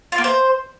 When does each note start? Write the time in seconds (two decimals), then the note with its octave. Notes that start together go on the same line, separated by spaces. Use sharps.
0.12 F4
0.18 A#3
0.24 C5